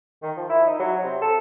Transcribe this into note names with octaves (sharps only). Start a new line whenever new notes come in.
D#3
F3
E4
D#4
F#3
C3
A4